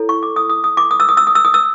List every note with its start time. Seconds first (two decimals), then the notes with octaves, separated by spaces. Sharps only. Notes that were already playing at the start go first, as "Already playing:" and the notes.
Already playing: E4 A4 C#5
0.09 C#6
0.23 D6
0.36 D#6
0.50 D#6
0.64 D#6
0.77 D6
0.91 D#6
1.00 E6
1.09 D#6
1.17 E6
1.27 D#6
1.35 E6
1.45 D#6
1.54 E6